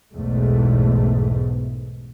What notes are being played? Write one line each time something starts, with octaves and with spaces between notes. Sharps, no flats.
B1 E2 G#2 A3